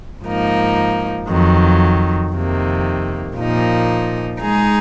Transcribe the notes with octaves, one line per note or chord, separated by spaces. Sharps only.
G#2 F3 A#3 D#4
F2 D#3 F#3
F2 C3 D#3 A#3
A#2 F3 A#3 D#4
G#3 D#4 G#4